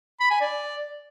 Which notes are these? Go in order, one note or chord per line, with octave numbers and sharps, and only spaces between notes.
B5
G#5
D5